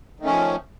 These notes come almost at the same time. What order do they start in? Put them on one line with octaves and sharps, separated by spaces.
D#3 A3 C#4 F3